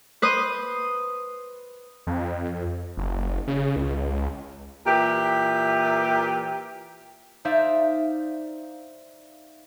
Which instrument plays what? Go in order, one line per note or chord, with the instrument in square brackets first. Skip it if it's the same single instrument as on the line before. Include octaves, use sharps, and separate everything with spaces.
[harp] B4 C5 D#6
[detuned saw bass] F2
F#1
C#3
C#2
[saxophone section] A#2 E3 G4
[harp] D#4 C5 D5 E5 F5